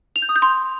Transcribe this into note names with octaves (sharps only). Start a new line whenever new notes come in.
F7
G6
D#6
G6
C6